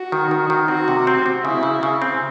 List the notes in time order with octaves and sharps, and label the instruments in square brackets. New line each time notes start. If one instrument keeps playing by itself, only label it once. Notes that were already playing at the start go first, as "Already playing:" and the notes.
Already playing: [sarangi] F#4
[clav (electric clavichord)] D#3
D#3
D#3
[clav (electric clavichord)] C4 [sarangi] F#4
[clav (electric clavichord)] C3
C4
C4
[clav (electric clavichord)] C#3 [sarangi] E4
[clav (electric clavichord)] C#3
C#3
C4